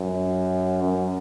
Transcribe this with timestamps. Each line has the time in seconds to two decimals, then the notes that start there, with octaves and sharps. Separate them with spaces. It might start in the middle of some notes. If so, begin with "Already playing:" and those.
Already playing: F#2
0.82 F#2